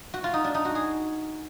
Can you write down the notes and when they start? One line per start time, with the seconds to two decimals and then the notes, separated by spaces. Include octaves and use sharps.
0.14 F#4
0.24 F4
0.34 D#4
0.44 D4
0.55 D#4
0.65 F#4
0.75 G#4